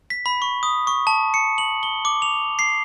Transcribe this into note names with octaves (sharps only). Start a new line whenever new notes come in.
B6
B5
C#6
D#6
C#6
A5
C#7
F#7
G7
D6
F7
C7